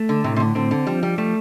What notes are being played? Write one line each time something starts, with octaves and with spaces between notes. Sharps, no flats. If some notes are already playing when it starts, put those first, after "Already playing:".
Already playing: A3
D3
A2 C3
C3
D3
D3 C4
D3
F3 G3
G3
G3 A3